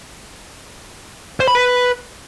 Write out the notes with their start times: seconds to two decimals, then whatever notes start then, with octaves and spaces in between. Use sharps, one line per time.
1.40 C5
1.48 B5
1.55 B4